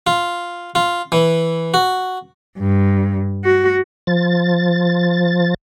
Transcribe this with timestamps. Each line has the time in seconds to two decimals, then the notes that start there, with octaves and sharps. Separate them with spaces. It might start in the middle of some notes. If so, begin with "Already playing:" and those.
0.07 F4
0.75 F4
1.12 E3
1.74 F#4
2.58 G2
3.44 F#4
4.07 F3 A6